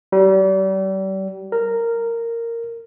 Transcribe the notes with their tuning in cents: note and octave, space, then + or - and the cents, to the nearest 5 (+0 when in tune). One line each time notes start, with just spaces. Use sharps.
G3 -35
A#4 -10